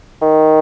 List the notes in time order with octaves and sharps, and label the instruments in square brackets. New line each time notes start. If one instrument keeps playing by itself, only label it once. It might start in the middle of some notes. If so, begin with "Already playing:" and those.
[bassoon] D#3